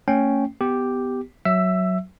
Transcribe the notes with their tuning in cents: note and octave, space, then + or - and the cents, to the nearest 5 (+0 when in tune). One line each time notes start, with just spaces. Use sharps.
A3 +40 C#4 +0 G5 -5
B3 +15 G4 +0
F#3 +0 E5 +0 E6 +15